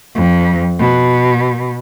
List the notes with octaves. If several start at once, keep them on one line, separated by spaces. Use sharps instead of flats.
F2
B2